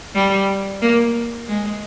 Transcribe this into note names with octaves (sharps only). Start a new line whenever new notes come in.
G3
A#3
G#3